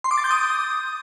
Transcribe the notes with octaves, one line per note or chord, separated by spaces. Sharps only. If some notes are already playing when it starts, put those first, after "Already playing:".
C6
D6
A6
G6
D#6